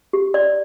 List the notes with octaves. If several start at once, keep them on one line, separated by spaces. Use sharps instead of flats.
G4
D5